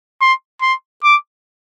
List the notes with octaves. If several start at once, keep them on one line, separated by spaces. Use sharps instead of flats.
C6
C6
D6